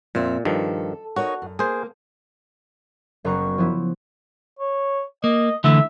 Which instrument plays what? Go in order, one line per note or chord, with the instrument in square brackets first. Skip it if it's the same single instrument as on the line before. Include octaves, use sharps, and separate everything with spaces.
[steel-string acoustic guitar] F2 C4 E5 [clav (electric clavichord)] A#2
[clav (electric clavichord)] G2 D#3 F3 [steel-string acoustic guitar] A4
[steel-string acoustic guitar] D#4 A#4 C#5 [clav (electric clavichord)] F#4
[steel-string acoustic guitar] F#2
[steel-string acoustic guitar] A#3 [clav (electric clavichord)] G#4 C5
[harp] F#1 F#2 B3 F#4 A#5 C#6
F3 B3 E4
[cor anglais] C#5
[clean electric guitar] A#3 [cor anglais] D#5
[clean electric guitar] D3 E3 A3 [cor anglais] E5